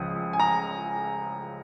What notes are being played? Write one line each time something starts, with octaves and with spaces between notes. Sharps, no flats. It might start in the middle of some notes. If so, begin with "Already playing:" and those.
Already playing: C#2 C#3 F3 D#6
G#5
A#5